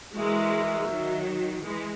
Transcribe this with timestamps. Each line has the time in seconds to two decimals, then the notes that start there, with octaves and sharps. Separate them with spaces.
0.15 E3 G#3 F#4 A#4 E5
0.90 D#3 F#3
1.63 E3 G#3